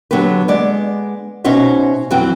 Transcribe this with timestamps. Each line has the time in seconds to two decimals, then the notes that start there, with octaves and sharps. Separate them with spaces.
0.11 D3 F#3 B3 G4 B4
0.48 G#3 B3 D5
1.44 B2 C#4 D#4 F#4 C5 E5
2.10 F2 E3 F#3 C4 F#4 G5